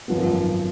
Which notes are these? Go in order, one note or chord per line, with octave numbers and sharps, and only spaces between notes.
G#1 F#2 F3 B3